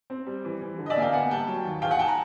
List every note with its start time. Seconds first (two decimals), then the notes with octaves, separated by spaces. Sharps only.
0.10 C4
0.27 G3
0.45 E3
0.61 E3
0.78 D3
0.86 D#5
0.90 D5 E5
0.96 A#3 G#5
1.02 F5 G5
1.13 B3 F#5 G#5
1.30 G3 G5 A5
1.47 F#3
1.64 D#2
1.82 E2 F5 G5
1.91 F#5 G#5
1.99 G5 A5
2.08 G#5 A#5